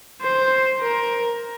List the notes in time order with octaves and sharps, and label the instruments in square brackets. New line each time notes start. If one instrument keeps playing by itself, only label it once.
[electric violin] C5
A#4